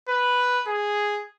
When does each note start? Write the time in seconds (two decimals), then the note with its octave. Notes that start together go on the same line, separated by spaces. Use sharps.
0.09 B4
0.67 G#4